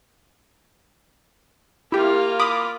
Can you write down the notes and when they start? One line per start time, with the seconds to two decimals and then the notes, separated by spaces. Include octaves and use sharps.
1.92 A#3 E4 F4 G4
2.39 B5 D6 D#6